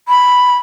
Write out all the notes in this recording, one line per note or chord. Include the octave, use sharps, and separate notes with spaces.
B5